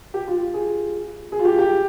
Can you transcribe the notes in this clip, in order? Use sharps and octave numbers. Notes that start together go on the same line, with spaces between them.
G4
F4
G#4
G#4
F4
G4
G4